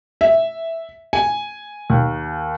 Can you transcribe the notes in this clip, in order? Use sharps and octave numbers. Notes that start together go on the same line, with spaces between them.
E5
G#5
D#2